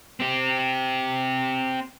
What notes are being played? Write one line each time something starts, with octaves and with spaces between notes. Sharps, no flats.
C4 G4